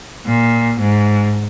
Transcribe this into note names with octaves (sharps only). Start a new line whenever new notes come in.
A#2
G#2